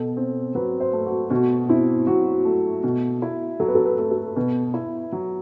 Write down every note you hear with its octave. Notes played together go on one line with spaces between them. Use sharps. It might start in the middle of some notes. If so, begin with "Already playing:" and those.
Already playing: B2 A4
C4
F#3 B4
C5
A3
F#4
B2 F#4
C4 E4
F#3 F#4
A3
B2
E4
F#3 A4
B4
A4
B4
A3
A4
B2 B4
E4
F#3